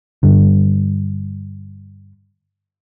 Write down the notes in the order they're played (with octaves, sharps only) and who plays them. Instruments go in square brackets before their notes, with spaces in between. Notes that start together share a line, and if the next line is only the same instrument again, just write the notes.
[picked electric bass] G2 D3